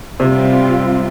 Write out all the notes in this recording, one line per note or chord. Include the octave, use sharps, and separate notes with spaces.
C3 G3 C4 F4